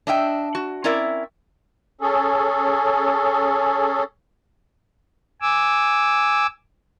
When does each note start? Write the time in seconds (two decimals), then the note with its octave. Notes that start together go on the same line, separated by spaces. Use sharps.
0.07 D4 D#5 E5 G5
0.55 F#4
0.84 C4 C#4 E4 A#4 D5 E5
2.01 C#4 G#4 A4
5.42 G#5 D6 E6